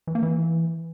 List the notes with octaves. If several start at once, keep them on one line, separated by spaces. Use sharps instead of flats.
E3
A#3
E3